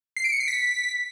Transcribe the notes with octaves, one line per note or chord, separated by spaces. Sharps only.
C7
D7
C#7
C7
B6